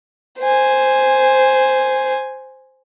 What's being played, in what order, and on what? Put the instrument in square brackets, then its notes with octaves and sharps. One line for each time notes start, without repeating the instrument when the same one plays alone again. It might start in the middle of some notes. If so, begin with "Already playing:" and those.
[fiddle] C5 G#5